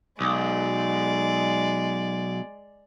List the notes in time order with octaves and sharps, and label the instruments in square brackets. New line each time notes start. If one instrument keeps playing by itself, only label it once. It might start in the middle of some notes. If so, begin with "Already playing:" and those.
[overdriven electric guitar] B1 [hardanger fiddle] G#3 D5